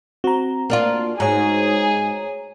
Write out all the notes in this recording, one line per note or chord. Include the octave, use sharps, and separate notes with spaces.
C4 F#4 A#5
A#3 D4 F4
G#2 G#4 C#5 G#5 A#5